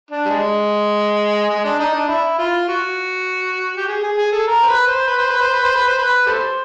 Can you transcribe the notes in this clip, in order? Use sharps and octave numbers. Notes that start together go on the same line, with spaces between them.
D4
G3
G#3
G#3
D4
D#4
D4
E4
F4
F#4
G4
G#4
G#4
G#4
A4
A#4
C5
B4
C5
B4
C5
B4
C5
B4
C5
B4
C5
B4
G4 A4 C5